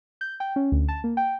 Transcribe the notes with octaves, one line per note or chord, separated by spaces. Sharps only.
G6
G5
C#4
D2
A5
A#3
G5